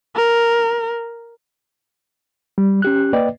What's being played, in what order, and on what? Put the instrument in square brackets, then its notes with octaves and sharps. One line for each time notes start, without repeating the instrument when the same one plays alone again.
[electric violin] A#4
[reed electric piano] G3
C#4 G4 F#6
A#3 B4 D5 D#5 G5